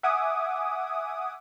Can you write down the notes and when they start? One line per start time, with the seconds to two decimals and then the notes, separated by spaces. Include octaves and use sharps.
0.03 E5 F#5 G#5 D6 D#6